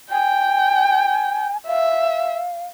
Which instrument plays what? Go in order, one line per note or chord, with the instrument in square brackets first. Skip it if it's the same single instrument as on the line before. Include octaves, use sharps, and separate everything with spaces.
[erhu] G5 [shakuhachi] G#5
[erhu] E5 [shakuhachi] F5